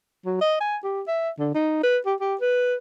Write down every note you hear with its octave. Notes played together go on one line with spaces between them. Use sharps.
F#3
D#5
G#5
G4
E5
D3
D#4
B4
G4
G4
B4